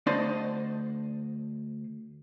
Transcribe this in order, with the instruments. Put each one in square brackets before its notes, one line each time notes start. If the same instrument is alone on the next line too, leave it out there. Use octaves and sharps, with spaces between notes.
[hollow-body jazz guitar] D2 D4 C5 D5 D#5 C6